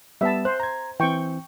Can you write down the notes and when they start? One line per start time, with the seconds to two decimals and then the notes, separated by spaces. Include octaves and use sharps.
0.21 G3 B3 E5 A5
0.45 C5 F#6
0.60 A#5 G#6
1.00 E3 C4 G5 C#6